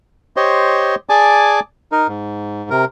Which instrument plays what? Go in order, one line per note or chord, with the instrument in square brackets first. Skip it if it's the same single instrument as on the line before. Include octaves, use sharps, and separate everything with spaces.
[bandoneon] G4 C5 C#5 D#5 C6
G#4 D5 G#5 A5 D6
D#4 A#4
G#2
C3 A#4